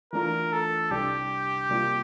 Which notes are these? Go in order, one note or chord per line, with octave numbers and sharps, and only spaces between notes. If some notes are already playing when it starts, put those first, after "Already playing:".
E3 A3 D4 F4 A#4
A4
C2 C3 G3 D4 G4
C3 G3 A#3 F4